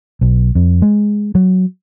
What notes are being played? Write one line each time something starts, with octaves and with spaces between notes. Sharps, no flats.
B1
F2
G#3
F#3